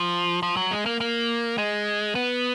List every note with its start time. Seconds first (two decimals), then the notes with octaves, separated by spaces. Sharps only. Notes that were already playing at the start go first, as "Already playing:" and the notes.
Already playing: F3
0.43 F3
0.57 F#3
0.71 G#3
0.86 A#3
1.00 A#3
1.58 G#3
2.15 B3